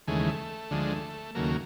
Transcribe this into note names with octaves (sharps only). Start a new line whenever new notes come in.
D#2 C#3 E3 G#3 A3
D2 D3 F3 G#3
D#2 C#3 F#3 A3 A#3